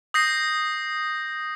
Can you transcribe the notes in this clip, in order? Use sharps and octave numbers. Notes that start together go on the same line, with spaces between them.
D#6 G6 A#6 C7